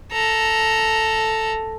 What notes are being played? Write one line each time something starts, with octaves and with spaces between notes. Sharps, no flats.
A4 A#5